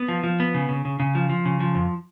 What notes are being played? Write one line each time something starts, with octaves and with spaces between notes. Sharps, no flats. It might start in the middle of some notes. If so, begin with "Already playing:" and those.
Already playing: B3
F3
F3
B3
C#3
C#3
C#3
C#3
F3
F3
C#3
F3
F2